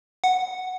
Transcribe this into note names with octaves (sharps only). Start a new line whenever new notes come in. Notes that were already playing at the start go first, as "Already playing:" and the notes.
F#5